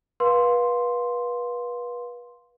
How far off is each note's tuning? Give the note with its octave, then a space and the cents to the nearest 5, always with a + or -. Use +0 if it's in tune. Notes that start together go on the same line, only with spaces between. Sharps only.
B4 -30 F5 +20 C6 +0